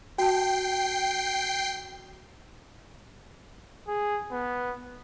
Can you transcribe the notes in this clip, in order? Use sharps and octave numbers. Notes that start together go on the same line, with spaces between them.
F#4 G5 A5 C7
G#4
B3